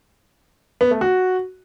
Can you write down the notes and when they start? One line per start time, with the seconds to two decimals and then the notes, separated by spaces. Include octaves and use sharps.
0.81 B3
0.91 A3
1.01 F#4